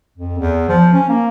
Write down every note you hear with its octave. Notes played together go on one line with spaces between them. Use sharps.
F2
E2
F3
C#4
A#3